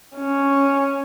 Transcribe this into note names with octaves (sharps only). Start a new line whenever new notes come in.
C#4